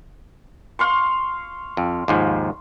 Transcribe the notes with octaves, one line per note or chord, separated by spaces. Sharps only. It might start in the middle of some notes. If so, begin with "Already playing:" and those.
F5 C6 C#6
F2
D#2 G#2 F3